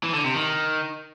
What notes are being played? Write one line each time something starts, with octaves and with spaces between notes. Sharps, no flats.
E3
D3
C3
D#3